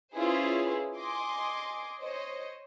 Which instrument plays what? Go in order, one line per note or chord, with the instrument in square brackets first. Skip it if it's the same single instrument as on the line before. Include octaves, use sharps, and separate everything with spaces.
[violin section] C#4 E4 F4 G#4 B4 C5
D#5 G#5 C6 D6
C5 C#5 D#5